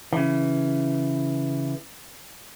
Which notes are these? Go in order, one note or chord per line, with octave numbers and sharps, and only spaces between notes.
C#3 E3